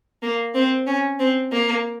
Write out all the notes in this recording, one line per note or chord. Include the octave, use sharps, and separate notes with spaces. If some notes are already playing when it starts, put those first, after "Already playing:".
A#3
C4
C#4
C4
A#3